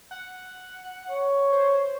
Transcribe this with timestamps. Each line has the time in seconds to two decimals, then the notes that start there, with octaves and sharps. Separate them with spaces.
0.11 F#5
1.10 C#5
1.52 C5